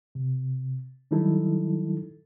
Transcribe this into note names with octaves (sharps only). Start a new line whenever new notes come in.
C3
D#3 F#3 G3 D#4 E4 A4